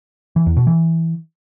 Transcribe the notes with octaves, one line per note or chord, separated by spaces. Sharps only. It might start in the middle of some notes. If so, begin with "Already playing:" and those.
E3
E2
B2
E3